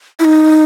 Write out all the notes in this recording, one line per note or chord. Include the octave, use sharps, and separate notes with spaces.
E4
D#4